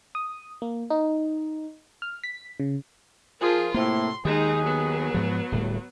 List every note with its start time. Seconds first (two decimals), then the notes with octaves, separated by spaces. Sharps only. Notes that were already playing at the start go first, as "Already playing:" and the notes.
0.15 D#6
0.62 A#3
0.90 D#4
2.02 F6
2.24 B6
2.60 C#3
3.40 F3 F4 G#4 A#4
3.74 A2 C3 A#3 C6
4.25 D#2 D#3 G#3 D#4 G#4
4.63 F#3 B3
5.14 G#2 F3
5.52 D1 A2 G3